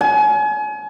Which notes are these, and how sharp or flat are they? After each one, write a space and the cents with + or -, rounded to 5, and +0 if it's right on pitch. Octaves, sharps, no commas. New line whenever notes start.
G#5 +35